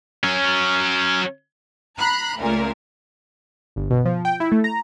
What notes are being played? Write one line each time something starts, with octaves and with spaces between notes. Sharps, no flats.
F#3 C#4
A#5 B5 F#6 C7
C#2 A#2 A3 A#4
G1
B2
F3
G5
E4
A3
A#5